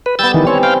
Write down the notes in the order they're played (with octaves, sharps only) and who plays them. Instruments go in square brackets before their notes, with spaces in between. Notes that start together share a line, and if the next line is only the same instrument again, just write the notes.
[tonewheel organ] B4
[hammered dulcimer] G3 B3 [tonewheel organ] E6 G6 A6
[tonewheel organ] D#3 E3
[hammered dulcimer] C4 G#5 [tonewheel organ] C#5
[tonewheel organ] F5 G5